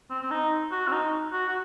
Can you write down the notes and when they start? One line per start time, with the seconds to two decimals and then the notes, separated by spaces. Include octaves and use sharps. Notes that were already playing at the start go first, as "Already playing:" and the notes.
0.10 C4
0.23 C4
0.31 D#4
0.72 F#4
0.88 C4
0.92 D#4
1.33 F#4
1.49 F#4